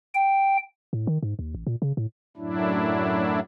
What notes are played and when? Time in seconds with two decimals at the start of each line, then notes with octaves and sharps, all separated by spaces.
0.15 G5
0.93 A2
1.07 D#3
1.23 G#2
1.39 D#2
1.55 A1
1.67 A#2
1.82 C#3
1.97 A2
2.37 F#2 A2 F#3 D4 E4